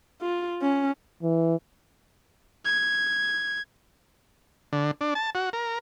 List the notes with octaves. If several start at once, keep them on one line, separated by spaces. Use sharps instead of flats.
F4
C#4
E3
G#6
D3
D4
A5
F#4
A#4